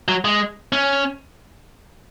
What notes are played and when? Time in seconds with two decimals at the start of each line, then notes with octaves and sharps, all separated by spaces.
0.08 F#3
0.25 G#3
0.73 C#4